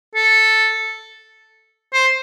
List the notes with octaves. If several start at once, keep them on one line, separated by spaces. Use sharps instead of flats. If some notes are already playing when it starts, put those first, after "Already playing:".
A4
C5